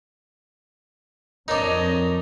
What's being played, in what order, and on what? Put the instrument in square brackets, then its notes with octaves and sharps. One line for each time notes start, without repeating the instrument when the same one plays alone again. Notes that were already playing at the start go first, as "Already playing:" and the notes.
[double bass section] F2 [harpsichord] D4 D#4 [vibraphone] A#4 [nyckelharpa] C#5 D#5